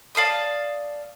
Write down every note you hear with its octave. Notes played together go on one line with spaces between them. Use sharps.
D5 F5 A5 D#6